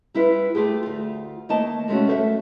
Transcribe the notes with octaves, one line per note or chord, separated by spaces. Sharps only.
G3 E4 F4 B4
A3 F4 G4 G#4
D2 F4
D#3 A3 A#3 D#5 A5
C3 G#3 A3 C#4 F#4
F#2 A4 C5 E5